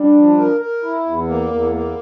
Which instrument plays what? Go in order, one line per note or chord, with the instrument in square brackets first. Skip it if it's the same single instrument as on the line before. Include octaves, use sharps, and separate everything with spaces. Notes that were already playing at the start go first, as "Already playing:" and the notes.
Already playing: [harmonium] G3 [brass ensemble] D4
[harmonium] F3
A#4
A#4
E4
E2
A#3
E2
A#3